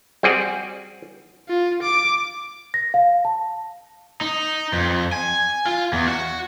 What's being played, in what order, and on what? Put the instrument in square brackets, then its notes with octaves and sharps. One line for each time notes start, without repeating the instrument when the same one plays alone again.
[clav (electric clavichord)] G3 C4 F#4 G#4 D5
[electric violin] F4
D6
[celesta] A#6
F5
A5
[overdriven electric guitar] D#4
F2
G#5
F4
E2
F#4